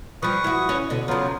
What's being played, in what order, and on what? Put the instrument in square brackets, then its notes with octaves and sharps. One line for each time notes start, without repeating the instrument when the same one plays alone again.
[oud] F3 G3 [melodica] B4 C#6 D#6
[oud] E4 F#4
C#4
B2 D3
[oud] C#3 F3 [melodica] F#3 B3 F4